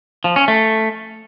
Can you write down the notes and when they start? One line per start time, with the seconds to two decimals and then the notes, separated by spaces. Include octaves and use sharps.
0.24 F3
0.36 C#4
0.48 A3